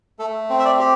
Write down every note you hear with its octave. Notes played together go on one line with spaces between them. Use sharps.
A3 A4
C4
E5
D5
G4